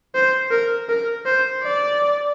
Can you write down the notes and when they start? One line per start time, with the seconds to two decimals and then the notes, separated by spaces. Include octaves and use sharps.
0.15 C5
0.51 A#4
0.89 A#4
1.26 C5
1.63 D5